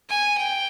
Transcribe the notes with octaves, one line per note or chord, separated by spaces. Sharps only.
G#5
G5